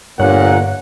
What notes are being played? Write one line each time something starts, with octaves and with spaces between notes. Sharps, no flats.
G1 G2 A#2 C#5 F#5 F#6